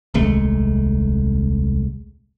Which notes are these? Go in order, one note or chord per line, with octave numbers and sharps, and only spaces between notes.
D#1 C2 G#3 A3